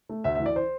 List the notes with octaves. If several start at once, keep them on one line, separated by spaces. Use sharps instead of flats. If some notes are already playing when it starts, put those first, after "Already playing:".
A3
D2 E5
E5
E3
D5
C5